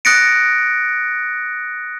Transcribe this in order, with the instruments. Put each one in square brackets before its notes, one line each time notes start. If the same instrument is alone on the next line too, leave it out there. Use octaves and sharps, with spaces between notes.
[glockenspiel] D#6 F#6 A6 A#6 C#7 D7